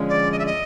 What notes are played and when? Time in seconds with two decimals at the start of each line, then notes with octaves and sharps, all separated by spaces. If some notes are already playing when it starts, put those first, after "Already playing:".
Already playing: F2 D3 F3 G#3 C#4
0.09 D5
0.32 D#5
0.39 E5
0.46 D#5